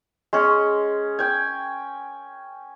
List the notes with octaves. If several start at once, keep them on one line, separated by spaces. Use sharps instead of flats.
G#3 C#4
G5 G#5